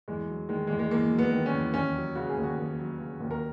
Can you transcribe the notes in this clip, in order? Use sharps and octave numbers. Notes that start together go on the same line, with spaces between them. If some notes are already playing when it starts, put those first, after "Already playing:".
E2 G#3
F#3
D#3 G#3
E2 G#3
G#3
E2 A#3
F#3
B3
D#3
C#4
E2
D#2 C#4
F#3
C#3 F#4
G#4
D#2
F#4
D#2
F#3
C#3
D#2
A#4